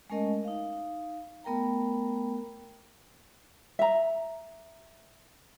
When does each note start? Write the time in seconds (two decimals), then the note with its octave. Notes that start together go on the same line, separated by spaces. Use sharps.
0.10 G#3 A3 C#4 A#4 D#5
0.44 D#4 F5
1.44 A3 B3 A#4 G5 A#5
3.79 E5 A#5